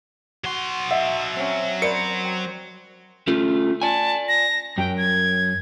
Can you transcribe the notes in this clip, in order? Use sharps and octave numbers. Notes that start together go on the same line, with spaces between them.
F#3 F#4 C6
D#5 E5 F#5
C4 C#4
A#4 C5 D5 B5 C#7
G5
A3 C#4 F4
D5 G#5 A5
A#6
F#2 F#3 G5
G#6